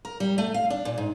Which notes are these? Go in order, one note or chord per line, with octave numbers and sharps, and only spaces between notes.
A#4
G3
A3
F5
D4
A#2
G#2